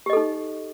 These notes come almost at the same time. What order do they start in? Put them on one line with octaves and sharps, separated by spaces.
G4 D#5 A4 D#4